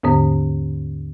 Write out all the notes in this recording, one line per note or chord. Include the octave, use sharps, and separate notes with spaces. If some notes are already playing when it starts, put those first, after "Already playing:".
D#2 G#2 D3 B3